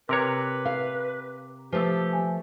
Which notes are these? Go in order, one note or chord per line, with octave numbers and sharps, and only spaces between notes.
C3 A#4 B4 C#5 A#5 D6
F5
F3 A3 G4 B4 E6
G#5